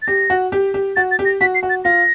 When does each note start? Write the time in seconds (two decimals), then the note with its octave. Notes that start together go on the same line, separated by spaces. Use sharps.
0.02 A6
0.07 G4 A#6
0.30 F#4
0.52 G4
0.74 G4
0.96 F#4 A6
1.11 A6
1.19 G4
1.25 A#6
1.41 F#4 B6
1.55 C7
1.63 F#4
1.70 A6
1.85 F4 A#6